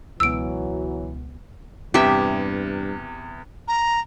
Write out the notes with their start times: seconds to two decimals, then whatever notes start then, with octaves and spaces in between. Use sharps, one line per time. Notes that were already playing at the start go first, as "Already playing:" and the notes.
0.20 C#2 B2 E3 F#3 B3 E6 D7
1.94 E2 G2 C3 G4 E5
3.68 A#5